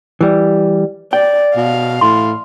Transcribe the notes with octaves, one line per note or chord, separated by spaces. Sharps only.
E3 G3
D5 G5
B2 F5
A2 C6